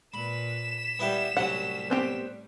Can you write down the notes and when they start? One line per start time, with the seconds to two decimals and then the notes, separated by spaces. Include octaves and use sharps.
0.14 A#2 B4 B5 B6 E7
0.99 G3 B3 E4 G4
1.37 C2 A2 F#3 G3 C#4 F#5
1.90 B3 C4 G4